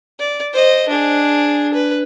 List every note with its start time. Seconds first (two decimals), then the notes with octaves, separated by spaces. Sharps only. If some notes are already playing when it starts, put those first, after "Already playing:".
0.20 D5
0.54 C5 D#5
0.89 D4 G#4
1.74 B4